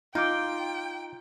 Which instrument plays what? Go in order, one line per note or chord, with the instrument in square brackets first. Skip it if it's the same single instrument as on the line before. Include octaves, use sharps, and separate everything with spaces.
[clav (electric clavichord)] D#4 [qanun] F4 [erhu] G5 [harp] D6 G6